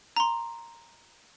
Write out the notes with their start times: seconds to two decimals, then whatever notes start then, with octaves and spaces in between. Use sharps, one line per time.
0.16 A#5 C6